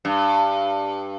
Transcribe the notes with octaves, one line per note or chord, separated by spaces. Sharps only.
G2